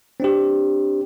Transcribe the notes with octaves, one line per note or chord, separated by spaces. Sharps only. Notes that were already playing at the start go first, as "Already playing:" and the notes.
C4 D4 G4